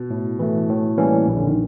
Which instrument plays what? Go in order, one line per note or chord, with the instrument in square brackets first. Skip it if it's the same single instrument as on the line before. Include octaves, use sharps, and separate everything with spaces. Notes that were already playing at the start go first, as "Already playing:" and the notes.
Already playing: [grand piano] B2
[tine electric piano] A2
E3 A3
A2
E3 G3 A#3 C#4
A#1
[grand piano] D3
D#3